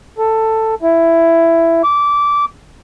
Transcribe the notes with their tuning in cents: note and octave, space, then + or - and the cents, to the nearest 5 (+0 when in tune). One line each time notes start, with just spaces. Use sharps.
A4 +10
E4 +10
D6 -15